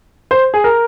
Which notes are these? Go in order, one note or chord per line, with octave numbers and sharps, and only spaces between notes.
C5
G#4
A#4